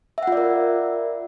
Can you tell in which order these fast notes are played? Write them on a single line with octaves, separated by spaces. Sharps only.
E5 F#5 F4 D5 A#4